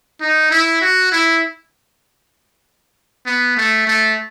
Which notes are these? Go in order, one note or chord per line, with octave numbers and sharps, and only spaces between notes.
D#4
E4
F#4
E4
B3
A3
A3